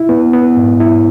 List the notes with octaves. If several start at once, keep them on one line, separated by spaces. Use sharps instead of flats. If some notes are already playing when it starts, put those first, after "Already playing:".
Already playing: E4
B3
B3
G#2
E4